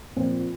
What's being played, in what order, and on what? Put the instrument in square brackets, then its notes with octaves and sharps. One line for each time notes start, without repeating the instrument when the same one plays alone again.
[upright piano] A#2 F3 C4